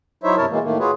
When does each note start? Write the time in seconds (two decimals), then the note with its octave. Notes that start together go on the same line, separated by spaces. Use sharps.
0.24 F#3 D#4 E4 C5 C#5 E5
0.37 G2 C3 E4 A#4 C#5 A5
0.50 B2 E3 G#3 A#3
0.63 A2 D#3 A3 A#3
0.79 F4 F#4 G#4 B4 C#5